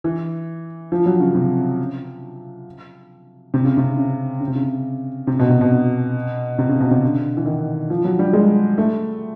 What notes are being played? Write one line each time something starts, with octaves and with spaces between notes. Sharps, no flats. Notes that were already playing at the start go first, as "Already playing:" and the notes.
E3
F3
F#3
C#3
C3
C3
C#3
C3
C#3
C#3
C3
C#3
C3
B2
C3
B2
C3
C#3
B2
C3
D3
E3
D#3
F3
F#3
G3
G#3
A3